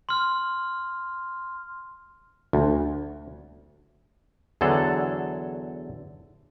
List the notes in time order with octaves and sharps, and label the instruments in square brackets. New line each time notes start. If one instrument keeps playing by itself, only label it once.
[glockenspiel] C6 F6
[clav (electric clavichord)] D2
E2 D3 F#3 G#4 A4